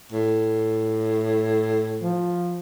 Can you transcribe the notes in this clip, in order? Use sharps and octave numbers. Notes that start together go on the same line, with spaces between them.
A2
F3